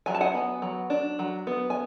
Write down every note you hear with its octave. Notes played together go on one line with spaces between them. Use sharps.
F#3 G#5
A5
F#5 G#5
B3
F#3
D4
F#3
B3
G#5